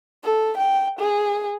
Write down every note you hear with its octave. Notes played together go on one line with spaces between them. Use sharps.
A4
G5
G#4